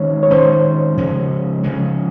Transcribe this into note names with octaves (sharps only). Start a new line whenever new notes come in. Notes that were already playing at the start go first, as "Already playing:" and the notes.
Already playing: D#3 G#3 C#4 C#5
C#5
D#3 G#3 C#4 C5
C#3 F3 G#3 C#4
C#3 F3 G#3 C#4